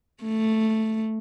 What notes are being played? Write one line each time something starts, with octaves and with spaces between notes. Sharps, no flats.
A3